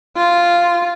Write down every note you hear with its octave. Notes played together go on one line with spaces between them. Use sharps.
F4